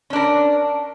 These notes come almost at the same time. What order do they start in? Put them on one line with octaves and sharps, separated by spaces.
C#4 D4 A#4